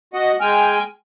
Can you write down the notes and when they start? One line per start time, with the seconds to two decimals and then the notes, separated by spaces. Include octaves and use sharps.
0.13 F#4 D#5 F#5
0.40 G#3 G5 G#5 F6